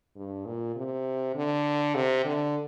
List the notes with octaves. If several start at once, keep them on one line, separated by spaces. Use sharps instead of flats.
G2
A#2
C3
D3
C3
D3